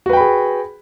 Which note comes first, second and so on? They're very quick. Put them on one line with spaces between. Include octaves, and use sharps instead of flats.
F#4 B4 G5 B5 G#4